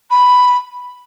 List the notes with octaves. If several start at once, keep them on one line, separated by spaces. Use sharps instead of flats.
B5